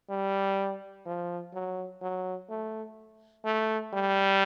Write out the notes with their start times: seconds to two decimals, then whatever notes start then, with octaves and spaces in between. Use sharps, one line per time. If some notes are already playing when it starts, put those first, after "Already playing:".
0.09 G3
1.06 F3
1.53 F#3
2.02 F#3
2.50 A3
3.45 A3
3.93 G3